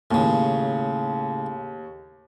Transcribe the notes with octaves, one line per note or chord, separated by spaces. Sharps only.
D#2 A2 C#3